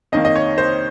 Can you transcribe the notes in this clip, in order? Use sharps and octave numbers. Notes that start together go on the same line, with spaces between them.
F2 D#3 A#3 D#5
D#5
C#5
C5